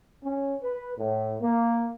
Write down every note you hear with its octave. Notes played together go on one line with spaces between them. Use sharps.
C#4
B4
A2
A#3